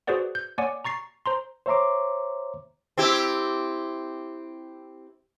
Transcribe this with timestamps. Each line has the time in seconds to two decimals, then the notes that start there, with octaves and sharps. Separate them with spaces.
0.07 F#4 G#4 B4 C5 D5 F#5
0.35 G6
0.58 A#3 C#5 D5 F#5 G#5 D6
0.84 A#5 C#6 A6 C7
1.26 C5 A#5 C6
1.66 C5 C#5 E5 A#5 C6 D6
2.97 C4 E4 G4